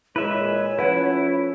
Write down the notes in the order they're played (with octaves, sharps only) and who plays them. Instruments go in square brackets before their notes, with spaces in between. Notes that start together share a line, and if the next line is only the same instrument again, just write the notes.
[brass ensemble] A#2 E3 G#3 [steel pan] E4 [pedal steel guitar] B4 E5 [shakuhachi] C#5
[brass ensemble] F3 A3 C#4 [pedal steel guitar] E4 [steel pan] B4 F#5